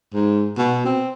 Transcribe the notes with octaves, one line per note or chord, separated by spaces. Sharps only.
G#2
B2
C4